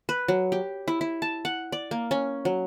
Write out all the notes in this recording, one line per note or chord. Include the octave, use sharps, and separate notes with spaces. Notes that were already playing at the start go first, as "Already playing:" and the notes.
B4
F#3
G4
E4
E4
A5
F#5
D5
A#3
C#4
F#3